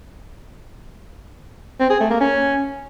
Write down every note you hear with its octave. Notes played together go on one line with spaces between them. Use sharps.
C4
G#4
A3
A#3
C#4